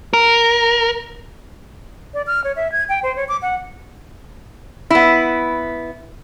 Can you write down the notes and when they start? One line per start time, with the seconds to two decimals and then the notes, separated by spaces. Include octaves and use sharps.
0.13 A#4
2.14 D5
2.27 F6
2.44 C#5
2.56 E5
2.72 G#6
2.89 G5
3.03 C5
3.16 C#5
3.29 D6
3.42 F#5
4.90 B3 E4